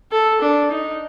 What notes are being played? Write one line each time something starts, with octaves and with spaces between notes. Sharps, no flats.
A4
D4
D#4